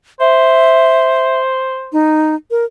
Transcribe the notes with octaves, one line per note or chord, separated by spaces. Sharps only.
C5 E5
D#4
A#4